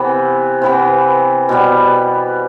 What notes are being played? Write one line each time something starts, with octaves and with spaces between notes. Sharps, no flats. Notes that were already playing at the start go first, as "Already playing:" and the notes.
Already playing: C3 E3 B3
C3 E3 B3
B2 G3 B3